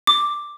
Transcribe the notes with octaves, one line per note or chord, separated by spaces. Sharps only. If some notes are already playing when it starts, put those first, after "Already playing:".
D6